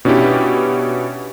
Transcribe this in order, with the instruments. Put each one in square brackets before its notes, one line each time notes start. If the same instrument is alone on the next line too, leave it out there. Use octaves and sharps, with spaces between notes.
[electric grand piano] B2 C#4 D4 E4 G4